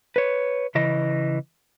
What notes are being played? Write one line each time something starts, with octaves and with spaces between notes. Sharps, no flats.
B4 C#5
C#3 E3 D#5